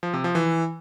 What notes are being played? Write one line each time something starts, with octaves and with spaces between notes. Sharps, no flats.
F3
C3
F3
E3